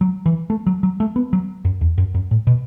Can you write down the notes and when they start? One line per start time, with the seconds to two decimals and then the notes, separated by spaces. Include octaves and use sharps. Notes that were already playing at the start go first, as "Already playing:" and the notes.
0.01 F#3
0.26 E3
0.50 A3
0.67 F#3
0.83 F#3
1.00 A3
1.16 B3
1.33 F#3
1.65 F#2
1.81 E2
1.98 F#2
2.14 F#2
2.31 A2
2.47 B2